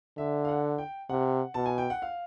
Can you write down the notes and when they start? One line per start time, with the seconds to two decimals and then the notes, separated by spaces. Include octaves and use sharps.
0.17 D3 E5
0.45 F5
0.48 F#5
0.78 G5
1.09 C3 F#5
1.54 B2 A5
1.66 G#5
1.78 G5
1.90 F#5
2.02 F5